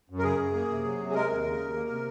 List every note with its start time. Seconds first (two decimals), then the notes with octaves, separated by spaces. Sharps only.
0.10 F#2
0.19 A#4
0.24 C#3 G#4
0.39 F#2
0.55 A#3
0.69 C3
0.85 F#3
0.99 C3
1.10 G#4
1.14 G#3 A#4
1.30 D#2
1.45 C#3
1.60 D#2
1.75 A#3
1.90 C3